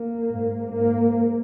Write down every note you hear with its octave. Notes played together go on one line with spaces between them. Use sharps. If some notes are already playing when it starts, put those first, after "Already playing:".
Already playing: A#3
G#2
G#2 A#3